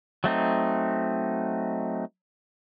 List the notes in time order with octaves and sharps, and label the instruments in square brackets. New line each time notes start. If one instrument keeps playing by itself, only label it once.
[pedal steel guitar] F#3 A3 C4 D#4